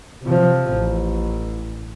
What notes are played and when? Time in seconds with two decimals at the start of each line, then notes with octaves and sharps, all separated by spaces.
0.24 C3 F3
0.71 A1